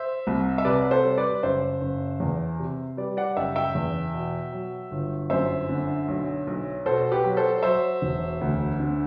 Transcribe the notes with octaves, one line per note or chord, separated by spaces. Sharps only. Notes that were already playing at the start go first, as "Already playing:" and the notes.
Already playing: C5 E5
C2
E5
C3 B4 D5
A4 C5
G3
B4 D5
F#1 C5 E5
F#1
E2
C3
G3 B4 D5
D5 F#5
F#1 E5 G5
E5 G5
E2
B2
F#3
G1
F#2 C5 E5
D3
B1
B1
B2 A4 C5
G4 B4
F#3
A4 C5
F#3 C5 E5
E1
D2
D3